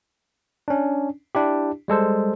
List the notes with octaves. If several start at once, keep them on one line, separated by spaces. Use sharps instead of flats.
C#4 D4
D4 E4 G4
G3 G#3 A4 C5